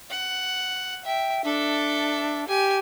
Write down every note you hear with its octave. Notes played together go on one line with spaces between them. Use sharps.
F#5
E5 G5
D4 A4 E5
G4 G#5